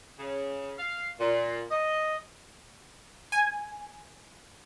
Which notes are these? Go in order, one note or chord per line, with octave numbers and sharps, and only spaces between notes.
C#3
F5
A#2
D#5
G#5